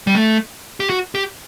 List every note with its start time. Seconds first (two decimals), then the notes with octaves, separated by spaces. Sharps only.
0.07 G3
0.15 A3
0.80 G4
0.90 F#4
1.15 G4